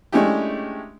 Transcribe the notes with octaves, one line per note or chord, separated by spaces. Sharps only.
G#3 A3 C#4 D4 E4 G4